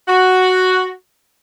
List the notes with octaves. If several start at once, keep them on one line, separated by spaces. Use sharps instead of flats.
F#4